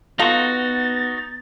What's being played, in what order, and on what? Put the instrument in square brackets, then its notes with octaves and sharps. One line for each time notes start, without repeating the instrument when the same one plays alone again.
[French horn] B3 [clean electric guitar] D#4 F#4 [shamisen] F4 A4 [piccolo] A6